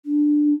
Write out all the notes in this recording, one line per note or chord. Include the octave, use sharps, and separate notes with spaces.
D4